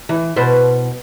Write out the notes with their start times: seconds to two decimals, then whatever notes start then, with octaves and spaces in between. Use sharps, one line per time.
0.09 E3
0.36 B2 B4 C5